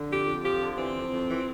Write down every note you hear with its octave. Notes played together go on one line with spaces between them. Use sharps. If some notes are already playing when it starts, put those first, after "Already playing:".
Already playing: D3
F2 G4
F2
F3 G4
D3
E3 C4
F2
F2
E3